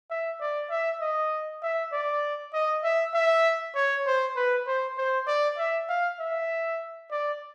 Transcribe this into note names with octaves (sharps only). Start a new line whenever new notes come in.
E5
D5
E5
D#5
E5
D5
D#5
E5
E5
C#5
C5
B4
C5
C5
D5
E5
F5
E5
D5